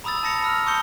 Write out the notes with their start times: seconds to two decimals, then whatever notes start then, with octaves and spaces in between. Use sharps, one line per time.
0.04 A#5 B5 D#6 E6 A6
0.23 A5 A6 A#6 C#7 F7
0.42 B5 E6 F6
0.66 A5 C#6 D#6 G6 C#7 G7